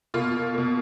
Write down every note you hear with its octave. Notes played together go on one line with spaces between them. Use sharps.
B2 A#3 F4
B2 A#3